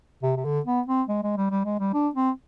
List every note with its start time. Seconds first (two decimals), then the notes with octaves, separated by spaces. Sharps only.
0.23 C3
0.36 C3
0.45 D3
0.66 B3
0.87 C4
1.08 G#3
1.23 G#3
1.37 G3
1.51 G3
1.65 G#3
1.80 G3
1.93 D4
2.15 C4